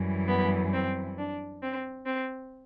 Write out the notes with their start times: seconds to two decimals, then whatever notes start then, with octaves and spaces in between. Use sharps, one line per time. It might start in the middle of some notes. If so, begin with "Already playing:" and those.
Already playing: F#2 E3 G3
0.28 B3
0.72 C4
1.17 D4
1.62 C4
2.05 C4